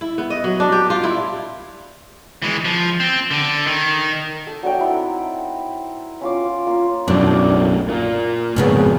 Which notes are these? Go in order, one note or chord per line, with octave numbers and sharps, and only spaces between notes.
E4
B3
D#5
F#3
D4
G4
F4
E4
E3 G#3
F3
C4
D3
D#3
A4
F#3 D4 E5 G5
C4 D#4 E4 F#5
C#4 F4 D6
A#3 F4
B1 F#2 A2 D4
A#2
G#1 F2 C#3 B3